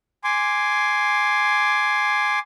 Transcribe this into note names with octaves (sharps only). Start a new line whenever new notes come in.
G#5 C6 D6